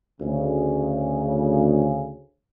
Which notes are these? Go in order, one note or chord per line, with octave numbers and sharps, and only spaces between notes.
D2 C#3